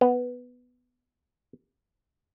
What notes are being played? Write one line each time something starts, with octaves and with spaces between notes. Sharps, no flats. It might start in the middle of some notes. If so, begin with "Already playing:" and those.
B3